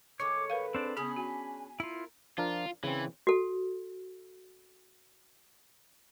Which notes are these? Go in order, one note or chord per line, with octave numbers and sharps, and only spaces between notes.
A2 D#3 G#3 C#5 C#6 D6
A#4 B4 F5
C4 D4
C#3 B3 C#4 D4 G#4 B5 D#6
F#4 G#5
E4 F4 A#4
F3 D4 F4 A#4
C#3 E3 C4
F#4 A4